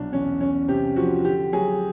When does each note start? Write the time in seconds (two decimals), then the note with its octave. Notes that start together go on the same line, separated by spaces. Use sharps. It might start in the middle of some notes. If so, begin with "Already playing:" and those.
Already playing: C2 B2 F#3 D4
0.13 E2 C#4
0.40 E2 C#4
0.68 C3 G4
0.96 F3 F#4
1.25 D3 G4
1.53 F#3 G#4